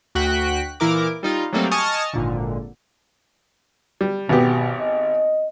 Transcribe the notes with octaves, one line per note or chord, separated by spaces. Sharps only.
D2 F#4 G5 F#6 B6
A#2 E3 E4 A#4 D6
G3 D#4 F4
F#3 G3 A3 A#3 C4 G4
D#5 G#5 A5 C#6 D#6 F6
G#1 A#2 D3
G3
G#1 B2 B3 G4
D#5